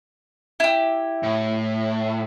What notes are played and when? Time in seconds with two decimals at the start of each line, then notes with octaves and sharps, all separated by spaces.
0.60 E4 G4
1.23 A2